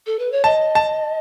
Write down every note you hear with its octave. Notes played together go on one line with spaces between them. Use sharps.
A4
B4
C#5
D#5 A5
A5